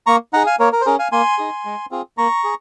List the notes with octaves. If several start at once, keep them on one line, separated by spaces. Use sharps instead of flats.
A#3 A#5 C#6
D#4 G#4 F#5 A#5
F5 G#5
A#3 A#4 C#5
A#4
C5
C#4 G#4 A#4
F5 G#5
A#3 G#5 C6
D#4 G#4
G#3
C4 F4 G#4
A#3 A#5 C#6
G#4